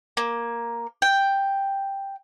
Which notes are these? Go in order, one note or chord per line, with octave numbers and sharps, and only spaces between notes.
A#3
G5